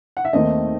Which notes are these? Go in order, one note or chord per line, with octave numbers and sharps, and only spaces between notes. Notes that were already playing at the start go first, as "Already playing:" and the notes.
F#5
E5
D#2 D#3 A3 C4 D#4 D#5